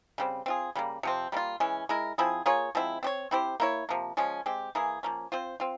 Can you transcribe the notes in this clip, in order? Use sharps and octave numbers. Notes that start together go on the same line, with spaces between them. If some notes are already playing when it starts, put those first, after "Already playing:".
C#3 G3 C4
C4 F4 G#4
C#3 G3 A#3
C3 F3 C4
G3 A#3 C#4 F4
E3 G#3 C#4
G#3 E4 A#4
F3 C4 E4 G#4
A#3 F4 G#4 C#5
F3 G#3 C4 E4
C4 G4 C#5
C4 E4 G4 C5
A#3 E4 A#4 C#5
C3 F3 A#3
F3 G#3 C#4
G#3 C4 G4
E3 A#3 E4 G#4
F3 A#3 C#4
C4 F4 C5
C4 F4